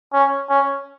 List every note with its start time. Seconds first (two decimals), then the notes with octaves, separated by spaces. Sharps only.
0.13 C#4
0.50 C#4